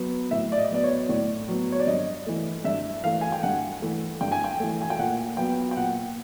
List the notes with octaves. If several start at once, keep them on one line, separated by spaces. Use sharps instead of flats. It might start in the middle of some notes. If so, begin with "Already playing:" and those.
Already playing: F#3 B3
A2 E5
D5
D#5
F#3 B3 D5
C#5
A2 D5
F#3 B3
C#5
D5
G2 D#5
E3 A3
G2 E5
E3 A3 F5
G#5
G5
G2 F#5
E3 A3
G2 G5
G#5
G5
E3 A3
G#5
G5
A#2 F#5
F#3 B3 G5
G5
A#2 F#5